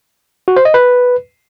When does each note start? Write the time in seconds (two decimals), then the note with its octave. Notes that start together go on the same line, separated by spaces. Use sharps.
0.48 F#4
0.56 C5
0.65 D#5
0.74 B4